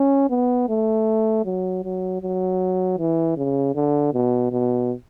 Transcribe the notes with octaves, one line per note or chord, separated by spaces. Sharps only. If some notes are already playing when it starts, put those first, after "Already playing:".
Already playing: C#4
B3
A3
F#3
F#3
F#3
E3
C#3
D3
B2
B2